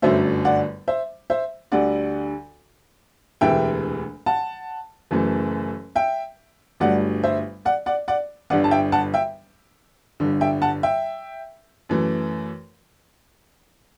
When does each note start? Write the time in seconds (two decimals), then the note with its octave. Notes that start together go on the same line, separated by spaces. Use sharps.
0.02 G1 F#2 D3 F#3 A3 C5 E5
0.45 D5 F#5
0.88 C5 E5
1.30 C5 E5
1.72 D2 D3 G3 D5 F#5
3.41 E1 D2 C3 E3 A3 E5 G5
4.26 F#5 A5
5.11 F#1 F#2 E3 A3
5.95 E5 G5
6.80 G1 G2 F#3 A3 D5 F#5
7.23 C5 E5
7.65 D5 F#5
7.86 D5 F#5
8.08 D5 F#5
8.50 G1 G2 D3 D5 F#5
8.64 A5
8.71 E5 G5
8.92 F#5 A5
9.14 E5 G5
10.20 G1 G2 D3
10.41 E5 G5
10.62 F#5 A5
10.83 E5 G5
11.89 F#2 E3 A3